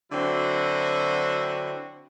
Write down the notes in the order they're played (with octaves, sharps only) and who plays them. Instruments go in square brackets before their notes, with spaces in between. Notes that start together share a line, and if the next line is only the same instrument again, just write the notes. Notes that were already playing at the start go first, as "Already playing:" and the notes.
[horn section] D3 F#3 C4 E4 F#4